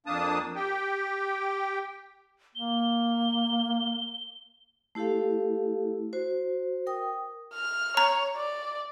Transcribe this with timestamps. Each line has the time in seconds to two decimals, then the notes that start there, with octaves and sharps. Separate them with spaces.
0.06 F2 A#3 D4 A5 D#6
0.56 G4 G5
2.55 A#3 G7
4.95 A3 E4 G4 A4 F5
6.13 F#4 C5
6.86 A#4 G5 D#6
7.54 F6
7.97 C#5 A#5
8.37 D5